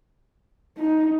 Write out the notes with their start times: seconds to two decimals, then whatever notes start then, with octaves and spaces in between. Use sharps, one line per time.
0.78 D#4